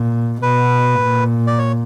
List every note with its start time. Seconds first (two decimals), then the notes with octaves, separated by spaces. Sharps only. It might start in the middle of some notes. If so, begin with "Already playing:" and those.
Already playing: A#2
0.42 B2 B4
1.01 A#2
1.47 D5
1.59 C#5